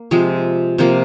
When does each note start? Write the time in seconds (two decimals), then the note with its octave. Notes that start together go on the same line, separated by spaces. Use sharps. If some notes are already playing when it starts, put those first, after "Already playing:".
Already playing: A#3
0.11 C3 F3 G#3
0.78 C3 F3 A#3